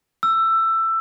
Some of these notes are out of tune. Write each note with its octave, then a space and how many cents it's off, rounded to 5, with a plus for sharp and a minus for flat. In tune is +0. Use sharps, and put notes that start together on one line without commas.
E6 +15